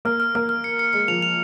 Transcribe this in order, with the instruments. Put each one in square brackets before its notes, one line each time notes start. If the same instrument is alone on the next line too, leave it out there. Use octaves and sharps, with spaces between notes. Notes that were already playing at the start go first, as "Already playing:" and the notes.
[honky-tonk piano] A#3 [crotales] F6
[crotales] F6
[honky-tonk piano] A#3 [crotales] F6
[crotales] F6
C#7
C#7
[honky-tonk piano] G#3 [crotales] C#7
[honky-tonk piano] F3 [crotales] F7
[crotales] F7